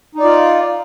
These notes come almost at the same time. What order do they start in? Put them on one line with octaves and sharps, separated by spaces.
D#4 D5 F4